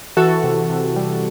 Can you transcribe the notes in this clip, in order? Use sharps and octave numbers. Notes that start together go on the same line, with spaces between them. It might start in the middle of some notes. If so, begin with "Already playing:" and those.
E3 F#4 A4
C3
C3
G3